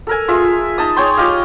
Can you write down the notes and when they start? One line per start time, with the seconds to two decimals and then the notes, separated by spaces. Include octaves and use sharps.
0.07 A4 A#4 G#5
0.28 F4 G#4 E5
0.78 D#4 A5 D#6
0.96 G#4 C#5 G5 C6
1.17 F4 G4 D#5 F5